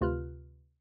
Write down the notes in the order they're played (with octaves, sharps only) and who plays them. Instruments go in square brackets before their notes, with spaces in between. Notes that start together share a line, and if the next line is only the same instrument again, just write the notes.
[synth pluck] D2 C3 F4 B4 F6 F#6